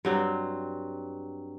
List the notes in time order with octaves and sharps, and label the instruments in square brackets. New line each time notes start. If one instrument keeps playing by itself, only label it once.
[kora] G2 F#3 C4